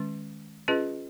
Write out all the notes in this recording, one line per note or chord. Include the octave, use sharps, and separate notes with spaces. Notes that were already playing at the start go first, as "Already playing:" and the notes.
Already playing: D#3 G#3 C#4
C#4 F4 G#4 B4 D#5